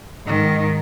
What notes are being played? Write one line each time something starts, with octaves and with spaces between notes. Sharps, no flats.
G#2 D#3